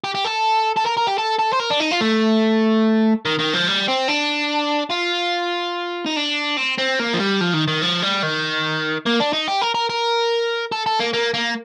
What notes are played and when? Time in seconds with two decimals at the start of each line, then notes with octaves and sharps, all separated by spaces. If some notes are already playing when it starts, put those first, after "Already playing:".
0.04 G4
0.15 G4
0.25 A4
0.77 A4
0.86 A#4
0.98 A#4
1.08 G4
1.18 A4
1.39 A4
1.53 C5
1.59 A#4
1.70 D4
1.80 D#4
1.91 F4
2.01 A3
3.25 D#3
3.39 D#3
3.53 F3
3.67 G3
3.88 C4
4.08 D4
4.91 F4
6.06 D#4
6.16 D4
6.57 C4
6.78 C4
6.99 A#3
7.13 F3
7.19 G3
7.41 F3
7.54 D#3
7.68 D#3
7.82 F3
8.02 G3
8.23 D#3
9.06 A#3
9.20 D4
9.33 D#4
9.48 G4
9.62 A#4
9.75 A#4
9.90 A#4
10.72 A4
10.86 A4
11.00 A#3
11.13 A#3
11.34 A#3